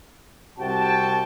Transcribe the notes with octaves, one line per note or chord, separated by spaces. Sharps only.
C2 C3 F#4 G5 A5